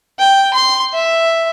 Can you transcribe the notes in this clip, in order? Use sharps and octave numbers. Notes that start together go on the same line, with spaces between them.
G5
C6
E5